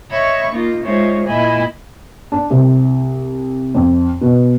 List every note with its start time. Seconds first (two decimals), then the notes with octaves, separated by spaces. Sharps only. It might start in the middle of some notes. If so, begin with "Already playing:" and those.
0.11 C#5 D#5 E5 B5 C#6
0.51 A#3 D#4 F4
0.83 G#3 D#4 F4 C5 C#5 E5
1.27 A#2 E4 D#5 E5 G#5 B5
2.32 D4
2.50 C2
3.75 F2
4.21 B2